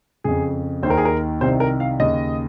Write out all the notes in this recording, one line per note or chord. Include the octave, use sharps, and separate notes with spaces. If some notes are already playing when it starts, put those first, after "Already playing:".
F2 C#3 G#4
D#2 D#3 A#4 C5
G#4
A#4
C2 C3 D#3 C5
A#4
F5
D#2 C#3 D#5